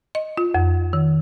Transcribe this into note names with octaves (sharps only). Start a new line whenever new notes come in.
D#5
F4
F2
D#3